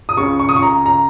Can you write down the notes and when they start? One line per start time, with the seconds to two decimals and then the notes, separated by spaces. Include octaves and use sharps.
0.09 D#6
0.17 C#2 C#3 C#6
0.40 C#6
0.49 D#6
0.56 C#6
0.63 A#5
0.86 A#5